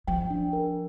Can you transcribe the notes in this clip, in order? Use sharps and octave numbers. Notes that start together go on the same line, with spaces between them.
F3 G5
D4
A#4